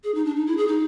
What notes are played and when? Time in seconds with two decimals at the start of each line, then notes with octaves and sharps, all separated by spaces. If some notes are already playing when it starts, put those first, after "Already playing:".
0.04 G#4
0.15 D#4
0.25 D4
0.36 D#4
0.47 E4
0.57 G#4
0.68 D#4